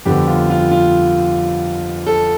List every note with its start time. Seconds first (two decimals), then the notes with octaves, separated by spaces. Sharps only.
0.05 F2 D3 G3 B3 G4
0.27 F4
0.50 F4
0.71 F4
2.06 A4